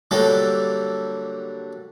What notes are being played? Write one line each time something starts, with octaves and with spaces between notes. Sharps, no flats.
D3 F#3 G3 A#3 A4